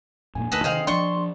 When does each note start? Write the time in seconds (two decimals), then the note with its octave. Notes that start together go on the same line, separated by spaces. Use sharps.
0.35 F2 A#2 A#3 G#5
0.52 D2 D#4 A4 B4
0.64 C3 D#3 G#4 C5 D#5 F5 G5
0.87 F3 D4 D5 C6 C#6